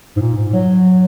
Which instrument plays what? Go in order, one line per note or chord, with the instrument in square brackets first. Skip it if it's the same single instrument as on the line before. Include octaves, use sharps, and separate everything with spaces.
[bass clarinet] G#2
A#2
G#2
F#3